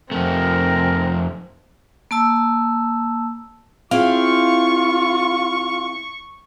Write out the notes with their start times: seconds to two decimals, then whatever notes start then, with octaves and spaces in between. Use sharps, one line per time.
0.12 F2 A3 C4 A#4
2.11 A#3 A5 E6
3.91 C4 E4 F4 G#4 F5 C#6